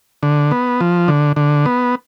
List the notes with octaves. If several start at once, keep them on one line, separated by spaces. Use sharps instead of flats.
D3
B3
F3
D3
D3
B3